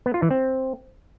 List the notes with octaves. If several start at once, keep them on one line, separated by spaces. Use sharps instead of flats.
B3
F4
E3
C4